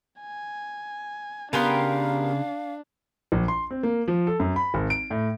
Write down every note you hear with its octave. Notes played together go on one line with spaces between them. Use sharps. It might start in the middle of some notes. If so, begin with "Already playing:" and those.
G#5
C#3 B3 D4 G4 A#4 F5 G#5 C6
A#1
C6
C4
A#3
F3
A4
F#2
B5
G#1
D7
A2